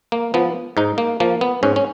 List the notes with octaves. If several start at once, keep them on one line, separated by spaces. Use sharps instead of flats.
A#3
F3 B3
G#2 D#4
A#3
F3 A#3
B3
G#2 C#4
C#4